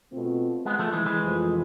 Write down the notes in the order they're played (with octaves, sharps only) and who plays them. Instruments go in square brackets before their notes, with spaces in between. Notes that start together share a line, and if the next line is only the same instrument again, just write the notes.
[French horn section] B2 A3 C4 F4
[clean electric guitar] G#3 B3
F3 A3
E3 G#3
E3 G#3
[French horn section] F2 C3 F3 A3